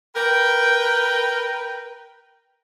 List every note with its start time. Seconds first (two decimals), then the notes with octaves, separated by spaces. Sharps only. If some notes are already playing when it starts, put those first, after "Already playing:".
0.15 A#4 B4 G5